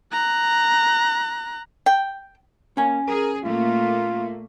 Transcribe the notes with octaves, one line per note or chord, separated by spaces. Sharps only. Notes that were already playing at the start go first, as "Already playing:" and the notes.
A#5 F#6
G5
A#3 C#4 G#5
G#4 A#4
A#2 A3 A#3 F4